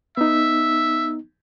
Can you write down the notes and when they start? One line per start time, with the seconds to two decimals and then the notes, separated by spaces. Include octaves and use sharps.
0.17 B3 D#4 E5